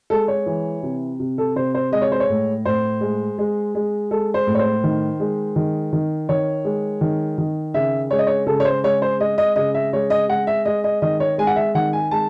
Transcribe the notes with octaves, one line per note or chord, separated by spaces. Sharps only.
G#3 A4
C#5
E3
C3
C3
A4
C3 C5
C5
G#3 D#5
C#5
C5
C#5
A2
A2 C5
G#3
G#3
G#3
G#3 A4
C5
A2
C#5
C5
D#3
G#3
D#3
D#3
D#3 C#5
G#3
D#3
D#3
C#3 E5
G#3 C#5
D#5
C#5
C#3 A4
C#5
C5
G#3 C#5
C5
G#3 D#5
D#5
C#3 D#5
E5
G#3 C#5
D#5
G#3 F#5
E5
G#3 D#5
D#5
D#3 D#5
C#5
G#3 G#5
F#5
E5
D#3 F#5
G#5
G#3 A5